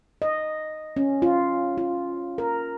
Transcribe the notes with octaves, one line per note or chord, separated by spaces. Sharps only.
D#5
C#4
F4
F4
A#4